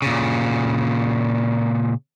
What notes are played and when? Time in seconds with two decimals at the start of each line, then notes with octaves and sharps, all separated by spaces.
0.02 A#2 C#3